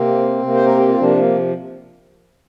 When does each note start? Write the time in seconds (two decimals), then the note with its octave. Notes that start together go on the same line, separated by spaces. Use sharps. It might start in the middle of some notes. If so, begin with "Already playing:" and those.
Already playing: C3 A#3 C4
0.42 C3 A#3
0.54 C5
0.66 A#4
0.77 G4
0.88 F4
0.98 C3 F3 A#3 D4
1.17 A#3